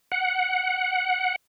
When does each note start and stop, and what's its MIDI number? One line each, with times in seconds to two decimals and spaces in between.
0.12 1.36 78